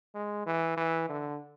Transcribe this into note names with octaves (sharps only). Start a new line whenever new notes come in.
G#3
E3
E3
D3